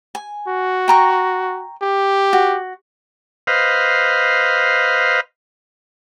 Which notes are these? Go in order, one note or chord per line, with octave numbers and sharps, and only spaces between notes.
G#5
F#4
G5 A#5 C#6
G4
F#4
B4 C5 D#5 F5